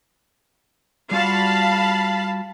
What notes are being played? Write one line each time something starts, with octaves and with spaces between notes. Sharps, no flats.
G3 F4 F#4 F5 A5 B5